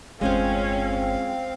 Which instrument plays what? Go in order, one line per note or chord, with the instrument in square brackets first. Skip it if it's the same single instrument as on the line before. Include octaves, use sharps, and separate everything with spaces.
[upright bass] G1 E2 [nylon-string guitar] G#3 F4 C5 [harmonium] C4 F5 [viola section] C#4